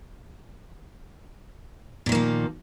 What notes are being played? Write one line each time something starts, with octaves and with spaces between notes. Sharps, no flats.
A#2 D#3 F3 A#3